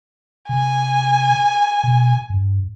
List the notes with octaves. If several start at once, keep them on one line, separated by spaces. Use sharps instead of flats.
C3 G#5
B2
G2